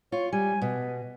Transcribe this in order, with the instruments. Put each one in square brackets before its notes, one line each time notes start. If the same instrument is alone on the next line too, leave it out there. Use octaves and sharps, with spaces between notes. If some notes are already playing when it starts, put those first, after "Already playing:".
[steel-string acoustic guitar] F4 [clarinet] C#5
[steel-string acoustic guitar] G3 [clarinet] G#5
[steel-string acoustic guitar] B2 [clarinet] B4